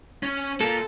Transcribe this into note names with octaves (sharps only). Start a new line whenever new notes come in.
C#4
A#3 F4 A4